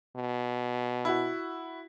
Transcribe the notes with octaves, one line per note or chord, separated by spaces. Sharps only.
B2
E4 F#4